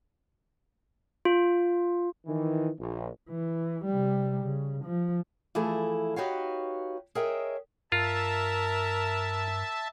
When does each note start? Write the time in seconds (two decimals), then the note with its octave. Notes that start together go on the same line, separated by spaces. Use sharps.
1.25 F4
2.26 D#3 E3
2.78 A#1
3.30 E3
3.85 C3 G3
4.44 C#3
4.85 F3
5.55 E3 F3 A3 E4 G#4 A4
6.16 D#4 F#4 G4 B4 C#5 F5
7.15 G#4 A#4 C#5 D#5 E5 G5
7.92 G2 F4 A#4 E5 A5